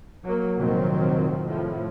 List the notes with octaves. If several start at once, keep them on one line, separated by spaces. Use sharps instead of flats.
F#3 A#3
F1 A#2 D#3 F3 F#3 C4
A2 F3